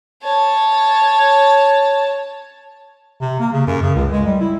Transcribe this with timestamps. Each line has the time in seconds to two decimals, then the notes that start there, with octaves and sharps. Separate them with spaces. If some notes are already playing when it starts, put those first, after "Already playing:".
0.23 C#5 A5
3.21 C3
3.40 A#3
3.53 C#3
3.67 F#2
3.82 C#3
3.95 C#2
4.12 G#3
4.26 G3
4.40 E4